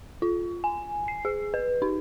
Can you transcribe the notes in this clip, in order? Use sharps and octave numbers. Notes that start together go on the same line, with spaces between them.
F4
G#5
C7
G#4
B4
D#4